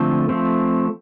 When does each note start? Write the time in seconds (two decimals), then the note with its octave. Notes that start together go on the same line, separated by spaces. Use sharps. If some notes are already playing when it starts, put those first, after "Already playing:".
Already playing: D3 F3 A3 C4
0.29 F3 A3 C4